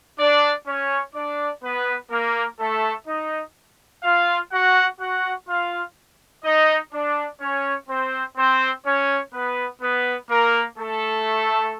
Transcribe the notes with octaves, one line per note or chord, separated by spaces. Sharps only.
D4 D5
C#4 C#5
D4 D5
B3 B4
A#3 A#4
A3 A4
D#4 D#5
F4 F5
F#4 F#5
F#4 F#5
F4 F5
D#4 D#5
D4 D5
C#4 C#5
C4 C5
C4 C5
C#4 C#5
B3 B4
B3 B4
A#3 A#4
A3 A4